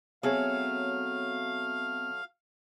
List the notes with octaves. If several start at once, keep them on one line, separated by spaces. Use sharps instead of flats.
F#3 A3 B3 C4 G#4 C#5 F5